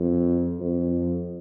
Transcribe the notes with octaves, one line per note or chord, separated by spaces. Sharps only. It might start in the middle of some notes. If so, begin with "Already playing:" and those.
Already playing: F2
F2